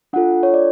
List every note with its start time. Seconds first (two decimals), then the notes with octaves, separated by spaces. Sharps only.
0.13 D4 F4 A4 F#5
0.43 C#5
0.54 D5